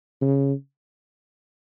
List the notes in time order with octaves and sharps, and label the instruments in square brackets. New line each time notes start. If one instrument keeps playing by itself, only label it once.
[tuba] C#3